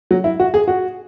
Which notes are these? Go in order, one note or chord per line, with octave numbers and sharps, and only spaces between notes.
F#3
E4
F#4
G#4
F#4